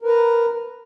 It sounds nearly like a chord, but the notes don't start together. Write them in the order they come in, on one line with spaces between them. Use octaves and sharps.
A#4 B4 A#5